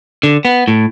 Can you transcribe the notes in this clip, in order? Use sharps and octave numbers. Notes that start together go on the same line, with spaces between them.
D3
B3
A2